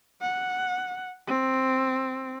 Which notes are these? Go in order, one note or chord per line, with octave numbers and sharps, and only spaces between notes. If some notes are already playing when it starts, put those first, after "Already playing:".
F#5
C4